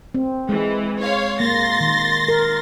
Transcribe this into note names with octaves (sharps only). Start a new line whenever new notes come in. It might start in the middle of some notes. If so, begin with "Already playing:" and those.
C4
E3 G#3
C#5 F5 C6
A#3 C6 A6 A#6
D#3
A#4